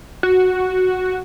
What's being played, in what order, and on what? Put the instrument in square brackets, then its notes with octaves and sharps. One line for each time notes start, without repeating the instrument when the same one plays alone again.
[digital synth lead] F#4